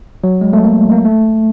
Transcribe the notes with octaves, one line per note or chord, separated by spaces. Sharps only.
F#3
G#3
A3
A#3
A#3
A3